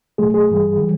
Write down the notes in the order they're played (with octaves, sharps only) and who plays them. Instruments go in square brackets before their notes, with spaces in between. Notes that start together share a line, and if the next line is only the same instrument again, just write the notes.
[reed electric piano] B2 F#3 A3 G#4
G#4
G2 E3 G3
E3 G3